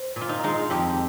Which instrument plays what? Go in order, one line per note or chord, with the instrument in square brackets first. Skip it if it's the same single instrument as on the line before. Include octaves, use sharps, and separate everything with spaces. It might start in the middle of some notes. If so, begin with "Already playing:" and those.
Already playing: [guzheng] C5
A#2
F4
D#4
G#3 D#4
F2 G4